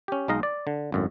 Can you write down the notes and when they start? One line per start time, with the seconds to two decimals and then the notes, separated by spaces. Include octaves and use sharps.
0.08 C#4 G4
0.28 B1 G#3 D#4 D#5 F5 A#5
0.43 D5
0.67 D3
0.92 G#1 F#2 A2